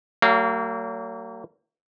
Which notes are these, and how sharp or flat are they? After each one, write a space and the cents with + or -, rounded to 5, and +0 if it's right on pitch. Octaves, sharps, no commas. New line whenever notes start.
F#3 +40 A#3 -35 F5 +0